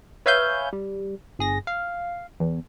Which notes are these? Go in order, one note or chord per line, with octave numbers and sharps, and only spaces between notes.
B4 C#5 E5 F5 G#5 G6
G3
G1 G#4 A#6
F5
E2